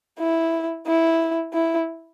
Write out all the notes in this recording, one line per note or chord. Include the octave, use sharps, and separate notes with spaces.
E4
E4
E4